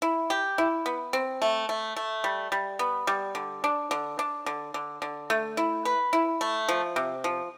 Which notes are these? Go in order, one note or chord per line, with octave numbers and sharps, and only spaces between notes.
E4
G4
E4
B3
C4
A3
A3
A3
G3
G3
B3
G3
D3
D4
D3
D4
D3
D3
D3
A3
E4
B4
E4
A3
F3
C3
F3